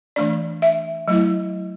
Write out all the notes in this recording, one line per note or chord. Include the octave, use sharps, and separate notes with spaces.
E3 A3 D4 D5
E5
F#3 A3 E4